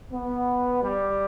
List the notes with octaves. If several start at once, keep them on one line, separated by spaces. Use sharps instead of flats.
B3
G3